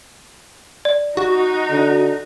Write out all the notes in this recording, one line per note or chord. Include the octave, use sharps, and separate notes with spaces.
D5
D#4 F#4
D3